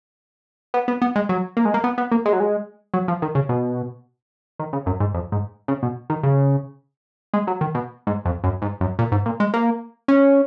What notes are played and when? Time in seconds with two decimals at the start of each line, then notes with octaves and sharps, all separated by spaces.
0.74 B3
0.88 B3
1.02 B3
1.16 G#3
1.29 F#3
1.57 A#3
1.65 G#3
1.74 A#3
1.84 B3
1.98 B3
2.11 A#3
2.25 G#3
2.33 F#3
2.40 G#3
2.94 F#3
3.08 F3
3.22 D#3
3.35 C#3
3.49 B2
4.59 D#3
4.73 C#3
4.86 F#2
5.00 G#2
5.14 F2
5.32 G#2
5.68 C#3
5.83 B2
6.10 D#3
6.23 C#3
7.34 G#3
7.47 F#3
7.61 D#3
7.75 B2
8.07 G#2
8.25 F2
8.44 F#2
8.62 G#2
8.80 F#2
8.99 A#2
9.12 G#2
9.26 A#2
9.40 G#3
9.54 A#3
10.08 C#4